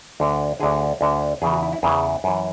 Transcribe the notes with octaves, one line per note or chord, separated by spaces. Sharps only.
D2 D3
D2 D3 G#4
D2 D3
E2 C#3 E3 G#4
F#4
E4
E4
E2 C#3 E3 G#4
F#2 E3